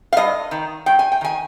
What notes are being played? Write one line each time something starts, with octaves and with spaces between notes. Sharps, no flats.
F5
G2 D#5
D#3
G2 G5
G#5
G5
D#3 G#5